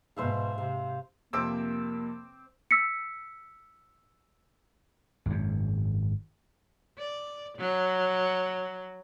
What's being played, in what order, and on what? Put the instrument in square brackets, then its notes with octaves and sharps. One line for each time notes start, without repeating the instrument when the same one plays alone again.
[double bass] G#2 B2 [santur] C5 E5 F5
[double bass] C3 [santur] F5
[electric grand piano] F2 C3 F3 [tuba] A#3 [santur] C4 D6 E6
[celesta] E6 B6 C#7
[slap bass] G#1 F#2
[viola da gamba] D5
F#3